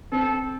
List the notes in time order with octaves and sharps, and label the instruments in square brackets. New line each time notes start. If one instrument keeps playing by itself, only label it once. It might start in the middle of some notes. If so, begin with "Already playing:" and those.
[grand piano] C4 [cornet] A4